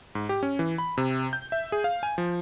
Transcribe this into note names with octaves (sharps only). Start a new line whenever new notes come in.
G#2
G4
C#4
E3
B5
C3
G6
E5
G#4
F5
G#5
F3